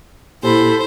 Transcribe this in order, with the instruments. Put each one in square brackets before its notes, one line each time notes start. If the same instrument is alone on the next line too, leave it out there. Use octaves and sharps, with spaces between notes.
[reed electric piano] A#2 A#3 G4 [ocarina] E4 [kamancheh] A4 B5 [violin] C5